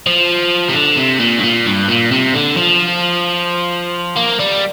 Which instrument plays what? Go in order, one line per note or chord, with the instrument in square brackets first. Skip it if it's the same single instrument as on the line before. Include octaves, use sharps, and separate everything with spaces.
[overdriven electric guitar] F3
C3
D3
C3
A#2
G2
A#2
G2
A#2
C3
D3
F3
A#3
G3